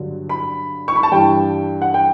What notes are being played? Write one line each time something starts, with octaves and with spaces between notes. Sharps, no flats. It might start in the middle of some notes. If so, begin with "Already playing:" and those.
Already playing: G2 D3 F#3
B5
C#6
B5
A5
G2 E3 G3 G5
F#5
G5